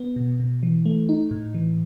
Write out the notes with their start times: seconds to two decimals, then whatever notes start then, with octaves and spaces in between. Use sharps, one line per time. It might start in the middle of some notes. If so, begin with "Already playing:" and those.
Already playing: B3
0.16 B2
0.40 B2
0.63 E3
0.85 A3
1.09 D#4
1.31 A2
1.54 E3